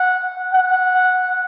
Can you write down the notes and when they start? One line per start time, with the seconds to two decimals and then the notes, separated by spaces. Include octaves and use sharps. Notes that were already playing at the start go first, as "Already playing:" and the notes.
Already playing: F#5
0.53 F#5